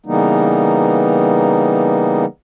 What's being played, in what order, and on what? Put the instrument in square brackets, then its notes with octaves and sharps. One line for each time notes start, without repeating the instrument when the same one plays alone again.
[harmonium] C#3 E3 G3 A#3 B3 D#4